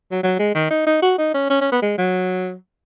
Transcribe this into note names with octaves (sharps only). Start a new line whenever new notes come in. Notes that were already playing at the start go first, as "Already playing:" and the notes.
F#3
F#3
G#3
D#3
D#4
D#4
F#4
D#4
C#4
C#4
C#4
B3
G#3
F#3